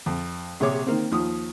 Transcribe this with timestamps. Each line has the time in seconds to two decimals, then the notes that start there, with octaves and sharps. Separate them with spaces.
0.06 F2
0.60 A#1 C3 G#4 C#5 D6
0.86 D#3 A#3 C4
1.11 D#2 F3 D#6